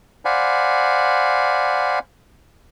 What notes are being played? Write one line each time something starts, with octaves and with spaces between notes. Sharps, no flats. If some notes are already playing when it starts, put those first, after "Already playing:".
C5 D5 F5 F#5 G#5 B5